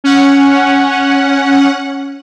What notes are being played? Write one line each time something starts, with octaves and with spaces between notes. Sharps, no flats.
C#4 F#5